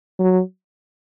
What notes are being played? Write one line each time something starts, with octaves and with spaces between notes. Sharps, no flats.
F#3